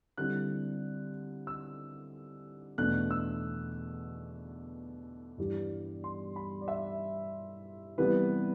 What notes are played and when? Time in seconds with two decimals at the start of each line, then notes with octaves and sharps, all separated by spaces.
0.18 D3 G3 C4 E4 F#6
1.47 E6
2.78 E2 B2 A3 D4 F#6
3.11 E6
5.38 G2 E3 G3
6.04 C6
6.36 B5
6.61 D5
6.68 E5
7.98 C3 E3 G3 B3 E4 B4